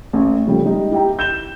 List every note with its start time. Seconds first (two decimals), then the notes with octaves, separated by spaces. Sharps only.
0.13 A1
0.46 C#3 F3 G3 A3
0.65 G3 G#3 D#4
0.91 E4 G4 G5 A#5
1.19 G6 E7 G7